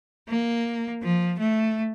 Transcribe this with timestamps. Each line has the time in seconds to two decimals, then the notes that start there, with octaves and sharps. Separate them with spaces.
0.28 A#3
1.02 F3
1.39 A3